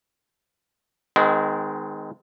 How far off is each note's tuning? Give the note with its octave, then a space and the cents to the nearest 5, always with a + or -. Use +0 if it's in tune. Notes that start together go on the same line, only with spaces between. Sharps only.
D#3 +0 G#3 +0 C4 -45